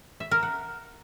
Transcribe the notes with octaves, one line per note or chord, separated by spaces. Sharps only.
E5
A#4
F#5